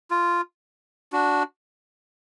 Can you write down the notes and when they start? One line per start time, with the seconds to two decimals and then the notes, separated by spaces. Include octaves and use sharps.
0.11 F4
1.13 D4 F#4